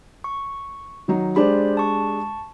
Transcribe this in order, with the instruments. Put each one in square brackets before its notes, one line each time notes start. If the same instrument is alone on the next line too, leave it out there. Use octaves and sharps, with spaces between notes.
[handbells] C#6
[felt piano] D#3 F#3 D#4
[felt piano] G#3 D4 G4 [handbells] C5 D5 B5
[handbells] A5 C#6